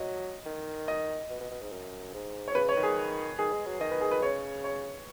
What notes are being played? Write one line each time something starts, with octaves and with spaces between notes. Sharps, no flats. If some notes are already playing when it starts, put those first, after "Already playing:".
Already playing: F#3 D#5
D#3
D#5
B2
B2
B2
G#2
F#2
G#2
C#5
C#3 B4
C#5
D#3
G#4
D#3 G#4
G#3
F#3
D#3 D#5
B4
G#4
B4
C#3 C#5
C#5